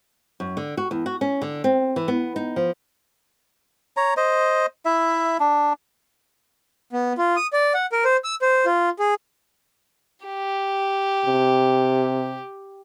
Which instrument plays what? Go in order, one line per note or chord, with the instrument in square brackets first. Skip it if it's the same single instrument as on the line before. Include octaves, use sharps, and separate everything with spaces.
[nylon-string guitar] F#2
D3
F#4
E2
F#4
C#4
D3
C4
E3
B3
D#4
F3
[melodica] C#5 A#5
C5 D#5
E4 E5
D4
[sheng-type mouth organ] B3
F4
D#6
D5
F#5
A#4
C5
E6
C5
F4
G#4
[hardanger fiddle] G4
[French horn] C3